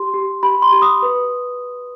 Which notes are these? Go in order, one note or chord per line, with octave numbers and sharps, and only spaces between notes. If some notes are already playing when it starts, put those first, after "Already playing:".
Already playing: G4 C6
G4
G4 B5
C6
G4
D#6
B4